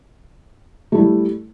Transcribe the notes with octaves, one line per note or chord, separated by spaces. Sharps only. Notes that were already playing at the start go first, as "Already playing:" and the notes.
G3 A3 E4